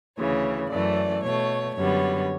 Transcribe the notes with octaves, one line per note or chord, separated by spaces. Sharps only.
D2 C#3 E3 C#5
F#2 E3 A3 D5
B2 A3 C#5
F#2 D3 G3 B3 C#5